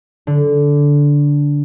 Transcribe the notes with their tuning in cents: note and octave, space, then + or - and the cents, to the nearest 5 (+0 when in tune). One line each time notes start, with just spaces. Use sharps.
D3 -15